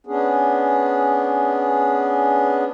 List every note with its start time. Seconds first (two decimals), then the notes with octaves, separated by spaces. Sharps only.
0.07 B3 C#4 D4 G#4